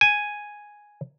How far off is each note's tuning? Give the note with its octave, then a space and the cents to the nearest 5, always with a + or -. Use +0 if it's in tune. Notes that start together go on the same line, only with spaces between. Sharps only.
G#5 +0